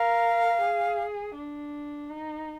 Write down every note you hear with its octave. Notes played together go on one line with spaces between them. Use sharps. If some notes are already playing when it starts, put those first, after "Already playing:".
Already playing: A#4 F5
G#4
D4
D#4